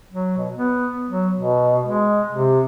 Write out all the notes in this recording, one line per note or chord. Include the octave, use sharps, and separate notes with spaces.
F#3
B2
B3
F#3
B2
G#3
C3